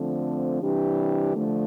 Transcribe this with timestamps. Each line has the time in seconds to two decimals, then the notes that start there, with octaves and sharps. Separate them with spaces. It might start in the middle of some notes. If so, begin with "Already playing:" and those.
Already playing: D3 F3 A3 C4
0.61 C3 E3 G3 D4 G4
1.35 D3 F3 A3